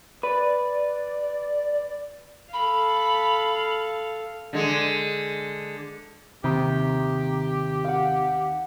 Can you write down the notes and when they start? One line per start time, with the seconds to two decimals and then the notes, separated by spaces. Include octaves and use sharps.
0.23 B4 D5
2.52 A4 F5 B5
4.53 D3 G#3
6.44 D#2 C3 D#3 G4
7.85 F5 F#5